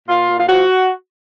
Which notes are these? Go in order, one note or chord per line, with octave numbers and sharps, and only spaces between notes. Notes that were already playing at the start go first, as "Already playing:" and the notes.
A#2 F4
A#2
F4
F3 F#4